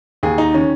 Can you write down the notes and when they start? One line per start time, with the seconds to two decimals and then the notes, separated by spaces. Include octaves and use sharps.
0.23 D#2 G#4
0.38 D#4
0.54 D#3 C#4